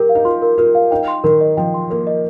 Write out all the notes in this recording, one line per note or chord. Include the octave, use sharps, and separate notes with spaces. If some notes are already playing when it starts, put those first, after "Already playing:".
Already playing: G4 A#4
F5
D#4
F4 C6
A#4
F4 A#4
F5
D#4 G5
C6
D#3 A#4
D#5
F3 G5
C6
A#3 A#4
D#5